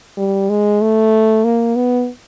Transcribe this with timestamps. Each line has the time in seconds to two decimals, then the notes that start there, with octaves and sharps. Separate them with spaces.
0.17 G3
0.49 G#3
0.81 A3
1.44 A#3
1.76 B3